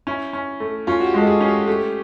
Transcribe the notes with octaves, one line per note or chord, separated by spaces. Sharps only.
C#4 E4
C#4
A3
C#4 F4
F#4
G4
G#3 A4
G#4
C#4
G4
A3 G4